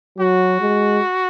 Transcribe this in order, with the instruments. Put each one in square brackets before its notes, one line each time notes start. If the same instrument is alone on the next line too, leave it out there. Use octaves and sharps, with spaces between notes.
[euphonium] F#3 [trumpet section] F#4
[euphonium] G#3